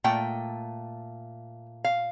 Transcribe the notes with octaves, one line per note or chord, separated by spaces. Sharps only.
A#2 A3 G5
F5